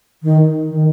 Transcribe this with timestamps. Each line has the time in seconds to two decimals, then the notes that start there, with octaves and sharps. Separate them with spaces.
0.23 D#3
0.70 D#3